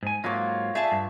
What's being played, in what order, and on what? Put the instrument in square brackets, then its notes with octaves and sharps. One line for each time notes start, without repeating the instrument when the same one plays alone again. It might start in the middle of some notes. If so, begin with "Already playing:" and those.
[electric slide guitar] G#2 G#5
[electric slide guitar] G#2 F#3 A#3 [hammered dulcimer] F4 C#5 D6
[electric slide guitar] A3 G#4 [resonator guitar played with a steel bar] E5 A5
[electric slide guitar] G2